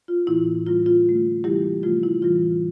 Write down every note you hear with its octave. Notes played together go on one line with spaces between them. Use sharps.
F4
A2 E3 A#3 E4
A2 G3 A#3 F4
F4
D3 A3
C3 E3 G3 A#3 E4 G4
C3 F3 A3 F4
E4
A2 E3 G3 F4